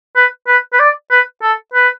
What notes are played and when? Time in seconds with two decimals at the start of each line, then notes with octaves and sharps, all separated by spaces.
0.16 B4
0.47 B4
0.73 B4
0.80 D5
1.11 B4
1.43 A4
1.74 B4